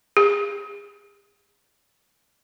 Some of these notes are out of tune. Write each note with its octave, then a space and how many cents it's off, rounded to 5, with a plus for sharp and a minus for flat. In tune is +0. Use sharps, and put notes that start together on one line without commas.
G#4 -35